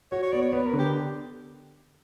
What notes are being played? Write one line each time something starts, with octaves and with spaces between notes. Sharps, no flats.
F#4 C#5
C#5
B3 D5
C#5
B3 B4
A#4
D3
G4